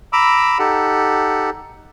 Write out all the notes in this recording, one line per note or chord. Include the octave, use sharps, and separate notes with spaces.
A#5 B5 D6 E6
D#4 G4 A4 F#5